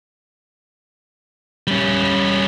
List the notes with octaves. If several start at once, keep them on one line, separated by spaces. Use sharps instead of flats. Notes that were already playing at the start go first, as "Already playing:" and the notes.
G3 C#4